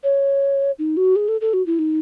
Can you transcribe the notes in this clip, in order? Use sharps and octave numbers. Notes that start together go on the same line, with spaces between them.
C#5
D#4
F#4
G#4
A4
A4
F#4
E4
D#4